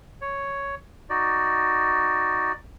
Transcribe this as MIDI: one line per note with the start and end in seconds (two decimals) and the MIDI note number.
0.21 0.75 73
1.10 2.52 63
1.10 2.52 66
1.10 2.52 74